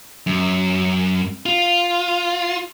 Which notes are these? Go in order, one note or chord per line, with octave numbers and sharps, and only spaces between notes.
F#2
F4